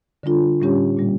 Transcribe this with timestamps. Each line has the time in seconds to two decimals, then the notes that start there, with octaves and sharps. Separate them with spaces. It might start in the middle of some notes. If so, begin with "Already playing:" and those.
0.23 D3 G3 D4 F4 A4
0.60 A2 G3 C#4 G4 C#5
0.97 A#2 G3 A#3